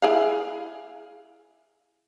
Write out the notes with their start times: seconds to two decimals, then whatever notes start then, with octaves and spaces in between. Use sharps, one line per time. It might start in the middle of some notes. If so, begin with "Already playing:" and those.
0.02 E4 G#4 F5